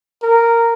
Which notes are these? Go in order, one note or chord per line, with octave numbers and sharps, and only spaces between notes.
A#4